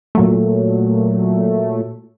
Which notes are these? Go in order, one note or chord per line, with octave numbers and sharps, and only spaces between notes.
A#2 F#3 A3